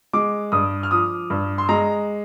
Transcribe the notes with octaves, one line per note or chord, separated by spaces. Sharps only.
G#3 D6
G2 D#6
F6
F3 D#6
G2
C6
G#3 A#5